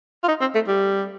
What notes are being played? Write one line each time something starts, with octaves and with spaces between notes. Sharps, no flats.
F4
D#4
C4
A3
G3